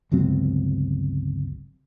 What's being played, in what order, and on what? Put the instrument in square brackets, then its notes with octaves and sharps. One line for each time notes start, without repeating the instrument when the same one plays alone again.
[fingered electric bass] G1 C#2 F#3 C4